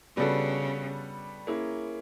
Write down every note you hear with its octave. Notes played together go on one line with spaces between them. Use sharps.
C#3 G3 B3 D4 F#4 A4
A#3 C#4 E4 G#4